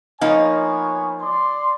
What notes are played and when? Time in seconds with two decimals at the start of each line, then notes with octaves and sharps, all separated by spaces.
0.21 F3 A#3 B3 D#4 C#5 G#5
1.22 D5 C6